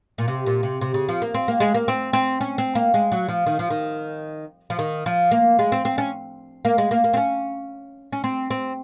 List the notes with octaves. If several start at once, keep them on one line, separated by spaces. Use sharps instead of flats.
A#2
C3
A#2
C3
C3
C#3
F3
A#3
C4
A#3
G#3
A#3
C4
C4
C#4
C4
A#3
G#3
F#3
F3
D#3
F3
D#3
F3
D#3
F3
A#3
G#3
C4
C4
C#4
A#3
G#3
A#3
A#3
C4
C#4
C#4
C4
C4